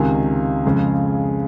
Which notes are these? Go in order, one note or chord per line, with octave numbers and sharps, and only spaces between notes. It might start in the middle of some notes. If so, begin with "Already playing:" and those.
Already playing: C#2 C3 D#3 F5 G#5
F2 C#3 G#3